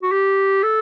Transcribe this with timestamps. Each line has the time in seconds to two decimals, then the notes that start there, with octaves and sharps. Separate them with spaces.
0.03 F#4
0.12 G4
0.63 A4